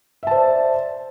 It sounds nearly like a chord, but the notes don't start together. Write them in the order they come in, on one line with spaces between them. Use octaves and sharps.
E5 A5 C5 D5